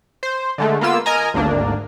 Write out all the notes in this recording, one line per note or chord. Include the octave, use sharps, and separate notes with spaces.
C5
D3 G#3 A3
A#3 B3 F4 E6
A#4 D#5 G#5 A#5
G#1 D2 A#3 D4